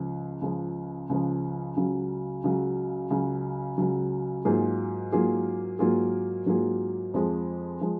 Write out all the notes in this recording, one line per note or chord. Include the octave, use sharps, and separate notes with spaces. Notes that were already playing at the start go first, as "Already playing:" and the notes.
Already playing: C#2 C#3 F3
C#2 C#3 F3
C#2 C#3 F3
C#2 C#3 F#3
C#2 C#3 F#3
C#2 C#3 F#3
C#2 C#3 F#3
G#2 F#3 A#3 F4 G#4
G#2 F#3 A#3 F4 G#4
G#2 F#3 A#3 F4 G#4
G#2 F#3 A#3 F4 G#4
F2 F3 G#3
F3 G#3